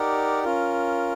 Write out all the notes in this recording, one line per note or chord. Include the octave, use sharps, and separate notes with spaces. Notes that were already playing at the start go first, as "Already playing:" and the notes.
Already playing: D#4 G4 A#4 D5 F#5
C#4 F4 A#4